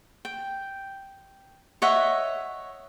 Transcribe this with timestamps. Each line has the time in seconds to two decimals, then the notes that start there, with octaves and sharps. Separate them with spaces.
0.25 G5
1.82 C#5 D#5 E5 F#5